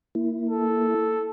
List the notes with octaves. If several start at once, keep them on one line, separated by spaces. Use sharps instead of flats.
A#3 E4
A4